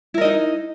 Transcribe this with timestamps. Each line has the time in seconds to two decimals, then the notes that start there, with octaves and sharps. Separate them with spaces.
0.14 E4
0.18 A#4
0.21 D#5
0.25 D#4